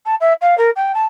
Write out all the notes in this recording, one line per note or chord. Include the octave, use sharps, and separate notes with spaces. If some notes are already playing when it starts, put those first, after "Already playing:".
A5
E5
F5
A#4
G5
A5